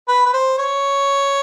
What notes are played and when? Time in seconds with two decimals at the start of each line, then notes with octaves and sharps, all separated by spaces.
0.08 B4
0.26 B4
0.33 C5
0.58 C#5